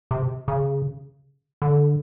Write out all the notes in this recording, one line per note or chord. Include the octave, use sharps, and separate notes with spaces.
C3
C#3
D3